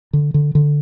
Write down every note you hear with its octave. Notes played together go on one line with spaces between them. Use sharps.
D3
D3
D3